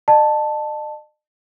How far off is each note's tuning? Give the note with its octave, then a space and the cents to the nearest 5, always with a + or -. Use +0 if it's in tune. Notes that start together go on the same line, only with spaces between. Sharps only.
D#5 -45 A5 +0